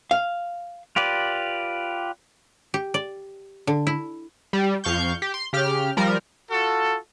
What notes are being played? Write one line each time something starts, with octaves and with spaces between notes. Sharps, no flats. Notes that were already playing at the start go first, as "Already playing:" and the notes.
F5
F4 G4 B4 D5
G4
D5
D3
E4
G3
F2 F5 C#6 G6
G4
C6
C#3 G4 F6
F3 G3 A#4
F4 F#4 A4